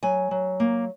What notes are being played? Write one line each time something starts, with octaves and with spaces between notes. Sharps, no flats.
F#3 G#5
F#3
A#3